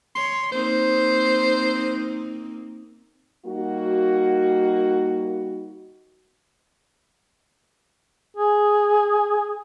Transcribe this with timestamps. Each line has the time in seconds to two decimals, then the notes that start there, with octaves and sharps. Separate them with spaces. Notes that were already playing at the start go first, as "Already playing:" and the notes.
0.15 C#5 C6
0.52 A#3 C4 D#4 C5
3.46 G3 A#3 D#4 F#4
8.37 G#4